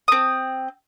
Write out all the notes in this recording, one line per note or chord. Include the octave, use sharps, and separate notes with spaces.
C4 D#6